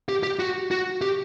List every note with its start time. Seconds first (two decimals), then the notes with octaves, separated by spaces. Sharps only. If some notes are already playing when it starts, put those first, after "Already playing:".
0.09 G4
0.23 G4
0.39 F#4
0.71 F#4
1.01 G4